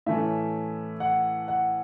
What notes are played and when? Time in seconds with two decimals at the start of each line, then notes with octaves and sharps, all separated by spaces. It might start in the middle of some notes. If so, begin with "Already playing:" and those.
0.06 A2 E3 A3 C#4 E5
1.00 F#5
1.48 F#5